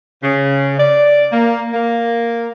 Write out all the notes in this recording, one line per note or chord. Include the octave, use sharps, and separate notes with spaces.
C#3
D5
A#3
A#3